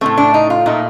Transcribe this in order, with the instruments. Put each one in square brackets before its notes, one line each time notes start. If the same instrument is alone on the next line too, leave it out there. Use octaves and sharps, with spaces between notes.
[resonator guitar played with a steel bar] A2 F3 A3 C4
D4
D#4
F4
A#2 A3 D#4